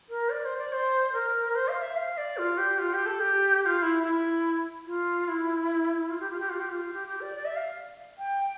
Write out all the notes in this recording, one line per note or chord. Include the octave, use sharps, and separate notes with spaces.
A#4
D5
C5
D5
C5
A#4
C5
F5
E5
F5
D5
F4
G4
F4
G4
A4
G4
G4
F4
E4
E4
F4
E4
F4
G4
F4
G4
F4
G4
F4
G4
G4
D5
D5
E5
F5
G5